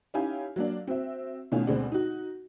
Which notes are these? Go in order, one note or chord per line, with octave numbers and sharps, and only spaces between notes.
C#4 D#4 E4 G4 F5 G#5
F#3 A#3 D4
C4 F#4 E5
B2 D#3 A3 C#4 F4
D2 B2 G#3 B3 C4 D4
D#4 F#4